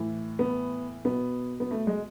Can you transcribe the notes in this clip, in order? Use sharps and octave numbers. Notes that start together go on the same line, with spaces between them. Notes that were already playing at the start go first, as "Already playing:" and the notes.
Already playing: A2 E3
B3
B2 B3
B3
A3
G#3